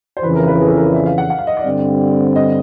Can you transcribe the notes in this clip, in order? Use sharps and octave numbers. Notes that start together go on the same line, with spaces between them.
C5
F2 C#3 E3 B4
A#4
B4
G#4
A4
A#4
D5
E5
F5
F#5
F#5
F5
D#5
D5
G2 D3 G3 C4
D#5